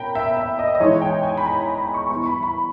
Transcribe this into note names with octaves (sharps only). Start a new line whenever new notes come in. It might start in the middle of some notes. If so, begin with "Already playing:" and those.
Already playing: B2 A#3 C#4 G5 A#5 B5
E5
E5
D#5
D#5
E3 G#3 D#4 C#5
G5
G#5
B5
A#5
B5
B5
C#6
G3 B3 E4 C#6
B5
B5